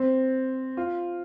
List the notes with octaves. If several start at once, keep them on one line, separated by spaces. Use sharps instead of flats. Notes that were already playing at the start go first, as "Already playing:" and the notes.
Already playing: C4
F4